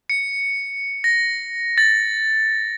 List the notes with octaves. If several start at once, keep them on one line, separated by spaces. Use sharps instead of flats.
C#7
A#6
A6